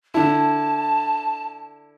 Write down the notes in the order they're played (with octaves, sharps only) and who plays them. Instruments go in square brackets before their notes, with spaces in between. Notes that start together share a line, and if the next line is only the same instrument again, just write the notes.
[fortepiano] D3 E4 [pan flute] A5